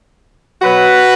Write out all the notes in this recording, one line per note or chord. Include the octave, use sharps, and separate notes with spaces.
B2 F#3 F#4 B4